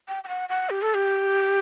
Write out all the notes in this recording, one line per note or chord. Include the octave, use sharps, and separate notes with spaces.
G5
G5
F#5
F#5
G4
A4
G4